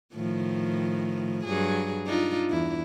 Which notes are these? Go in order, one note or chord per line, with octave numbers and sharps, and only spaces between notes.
A2 D#3 F3
G2 F#3 G#4
D4 D#4 F4
E2 E4